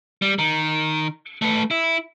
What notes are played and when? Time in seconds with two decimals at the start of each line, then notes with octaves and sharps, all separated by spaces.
0.22 G3
0.39 D#3
1.42 A3 B4
1.71 E4